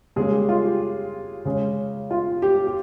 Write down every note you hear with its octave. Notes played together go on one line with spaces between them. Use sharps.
C#3 G3 G#3 A#3 C#4 G#4
G4
F4
G4
C#3 G#3 C#4
F4
G4
G4